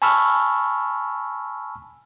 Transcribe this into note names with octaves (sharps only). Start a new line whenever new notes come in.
G#5 A5 B5 C#6 E6 F6